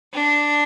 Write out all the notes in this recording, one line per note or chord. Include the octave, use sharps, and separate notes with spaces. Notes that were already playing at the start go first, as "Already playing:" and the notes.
D4